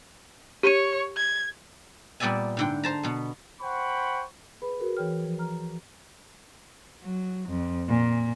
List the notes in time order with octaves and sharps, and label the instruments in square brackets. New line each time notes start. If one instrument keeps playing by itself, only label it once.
[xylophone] G4 D#7 [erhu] C#5
[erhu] G#6
[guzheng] A#2 G3 B3 D5 E5 G#5
G#2 D3 G5
C5 A5 A#5
B2 B3
[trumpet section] C5 F#5 G5 B5 C#6
[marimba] G#4 B4 B5
F#4 G#4 A#4
E3 G#4 C#5 G5 F6
F3
A#5 F6
[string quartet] F#3
F2
A#2